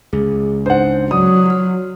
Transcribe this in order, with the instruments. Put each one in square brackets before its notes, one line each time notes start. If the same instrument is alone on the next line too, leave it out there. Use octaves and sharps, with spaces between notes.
[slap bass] C#2 [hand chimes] G#4
[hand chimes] D4 D#4 [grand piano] C5 F#5
[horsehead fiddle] F#3 [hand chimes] D5 [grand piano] D#6
[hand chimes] F#4 F6